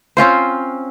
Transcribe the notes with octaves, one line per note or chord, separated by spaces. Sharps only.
C4 C#4 F4 C5